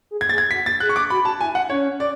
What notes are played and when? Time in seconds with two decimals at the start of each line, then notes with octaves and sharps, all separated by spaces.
0.11 G#4
0.21 G#6
0.29 G#4 A6
0.38 G#6
0.51 F#4 B6
0.66 A6
0.80 G#4 F#6
0.89 C#6
0.96 D6
1.10 F#4 B5
1.25 A5
1.40 E4 G#5
1.55 F#5
1.70 C#4 C#5
2.00 D5